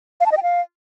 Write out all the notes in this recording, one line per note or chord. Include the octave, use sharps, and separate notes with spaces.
F5
A5
D#5
G5
F5